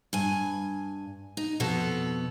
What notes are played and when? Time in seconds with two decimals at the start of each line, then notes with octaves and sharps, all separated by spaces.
0.13 G2 G#5
1.37 D#4
1.60 F2 B2 B3 A4